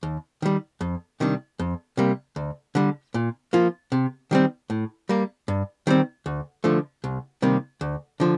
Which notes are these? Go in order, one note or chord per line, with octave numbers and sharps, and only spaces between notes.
D#2
D#3 G3
F2
C3 D#3 G3 D4
F2
C3 G3 A#3
D2
D3 G3
A#2
F3 A#3 F4
C3
D#3 G3 C4
A2
G3 A#3
G2
D#3 G3 C4
D2
D3 F3 A3
C2
C3 D#3 G3 A#3
D2
D3 F3